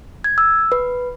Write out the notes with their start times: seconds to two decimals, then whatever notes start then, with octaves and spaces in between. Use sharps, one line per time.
0.24 G#6
0.38 E6
0.72 B4